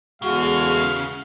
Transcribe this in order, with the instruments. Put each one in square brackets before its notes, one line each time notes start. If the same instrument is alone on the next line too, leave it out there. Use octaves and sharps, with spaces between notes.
[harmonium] E2 G#3 [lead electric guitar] C#3 [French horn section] A3 E4 F#4 [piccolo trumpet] F5